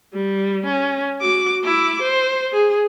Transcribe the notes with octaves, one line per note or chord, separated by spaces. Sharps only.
G3
C#4
F#4 D6
E4 D6
C5
G#4